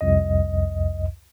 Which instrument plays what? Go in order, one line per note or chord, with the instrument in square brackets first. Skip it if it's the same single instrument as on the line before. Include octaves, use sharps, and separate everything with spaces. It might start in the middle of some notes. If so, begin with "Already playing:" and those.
[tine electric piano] C2 F2 D#5